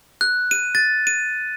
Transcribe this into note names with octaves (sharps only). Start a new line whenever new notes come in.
F#6
D#7
A6
D#7